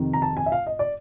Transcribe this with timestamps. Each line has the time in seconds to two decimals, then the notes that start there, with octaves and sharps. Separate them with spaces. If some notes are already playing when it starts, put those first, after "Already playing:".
Already playing: F2 C3 D#3
0.13 A#5
0.22 A5
0.37 G#5
0.46 E5
0.52 F5
0.67 D#5
0.79 D5